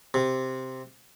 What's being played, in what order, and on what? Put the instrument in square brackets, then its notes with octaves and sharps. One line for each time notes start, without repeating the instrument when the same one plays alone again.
[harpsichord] C3